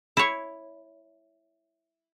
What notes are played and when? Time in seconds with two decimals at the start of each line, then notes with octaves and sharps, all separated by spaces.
0.17 E4 C#5